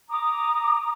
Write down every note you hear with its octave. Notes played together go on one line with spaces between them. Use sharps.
A#5 D6 D#6